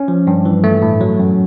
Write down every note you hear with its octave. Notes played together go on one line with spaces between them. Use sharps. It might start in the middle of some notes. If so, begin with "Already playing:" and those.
Already playing: C#4
F3
G2
E3
A3
A2
F#3
F#2